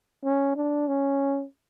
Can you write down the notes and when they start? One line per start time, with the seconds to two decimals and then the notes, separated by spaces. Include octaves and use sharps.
0.24 C#4
0.56 D4
0.88 C#4